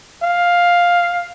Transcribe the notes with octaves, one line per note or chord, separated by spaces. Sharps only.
F5